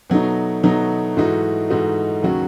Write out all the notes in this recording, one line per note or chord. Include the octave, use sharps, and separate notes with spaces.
B2 F#3 A3 D#4
B2 F#3 A3 D#4
G#2 E3 A3 D#4 F#4
G#2 E3 A3 D#4 F#4
D#2 C#3 F#3 C#4 F#4